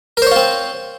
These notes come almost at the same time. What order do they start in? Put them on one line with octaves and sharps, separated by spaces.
A#4 C5 C#5 F4 C4